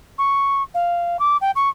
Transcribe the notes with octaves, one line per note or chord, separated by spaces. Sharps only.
C#6
F5
D6
G5
C#6